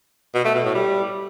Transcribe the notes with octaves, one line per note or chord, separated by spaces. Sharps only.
B2
A3
B2
A2
G3